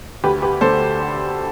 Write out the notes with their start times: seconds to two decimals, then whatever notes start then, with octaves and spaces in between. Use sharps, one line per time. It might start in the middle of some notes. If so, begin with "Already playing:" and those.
0.24 D2 G4 B4
0.42 G4 B4
0.61 D3 A3 A4 C5